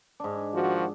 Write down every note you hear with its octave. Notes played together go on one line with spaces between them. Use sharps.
G#2 D4
D#3 F3 F#4